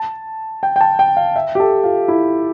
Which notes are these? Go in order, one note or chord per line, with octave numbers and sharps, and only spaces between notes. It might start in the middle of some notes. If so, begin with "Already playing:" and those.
Already playing: A5
G5
G5
A5
G5
F5
E5
G4
A4
F4
E4